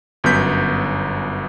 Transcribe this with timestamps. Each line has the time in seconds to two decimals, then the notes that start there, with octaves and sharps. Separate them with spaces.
0.24 G1 F#2 B3 G6 B6